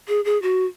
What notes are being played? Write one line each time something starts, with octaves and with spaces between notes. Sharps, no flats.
G#4
G#4
F#4